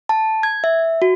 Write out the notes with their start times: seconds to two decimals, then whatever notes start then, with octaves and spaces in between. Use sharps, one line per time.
0.09 A5
0.43 G#6
0.64 E5
1.02 F#4